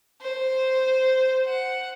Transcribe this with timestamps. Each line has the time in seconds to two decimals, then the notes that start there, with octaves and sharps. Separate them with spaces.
0.22 C5
1.46 F#5